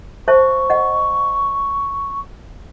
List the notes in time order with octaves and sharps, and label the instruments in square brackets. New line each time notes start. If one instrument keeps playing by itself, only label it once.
[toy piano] C5 E5 A5 [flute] C#6
[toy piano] D#5 F#5